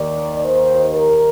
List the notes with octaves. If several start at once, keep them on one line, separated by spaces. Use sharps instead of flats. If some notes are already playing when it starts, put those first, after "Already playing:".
Already playing: D#2 D#3 D5
C5
A#4